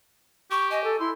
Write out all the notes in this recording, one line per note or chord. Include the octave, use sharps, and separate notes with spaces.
G4 C#6
D#5 G#5
A4
E4 C6